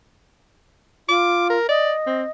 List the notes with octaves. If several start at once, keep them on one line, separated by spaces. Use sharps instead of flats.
F4 D6
A#4
D5 D#5
C4